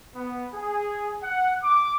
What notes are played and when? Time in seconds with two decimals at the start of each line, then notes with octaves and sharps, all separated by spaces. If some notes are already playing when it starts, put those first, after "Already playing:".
0.16 B3
0.54 G#4
1.22 F#5
1.63 D6